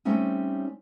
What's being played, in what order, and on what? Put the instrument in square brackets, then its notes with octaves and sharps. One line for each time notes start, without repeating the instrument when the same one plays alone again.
[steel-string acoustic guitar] G3 A3 C4 C#4 D#4